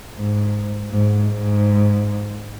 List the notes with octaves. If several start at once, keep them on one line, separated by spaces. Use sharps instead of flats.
G#2
G#2
G#2